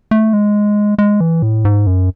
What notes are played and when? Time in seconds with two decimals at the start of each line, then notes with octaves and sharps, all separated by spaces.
0.11 A3
0.33 G#3
0.98 G#3
1.21 E3
1.42 A2
1.65 G#2
1.87 F#2